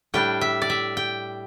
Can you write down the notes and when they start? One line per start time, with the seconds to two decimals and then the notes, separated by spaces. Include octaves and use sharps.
0.14 A2 G3 D4 G5
0.41 E5
0.62 D5
0.70 E5
0.97 G5